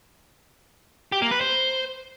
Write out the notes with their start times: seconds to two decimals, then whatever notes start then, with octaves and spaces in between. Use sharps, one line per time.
1.12 G4
1.22 A#3
1.31 B4
1.41 C5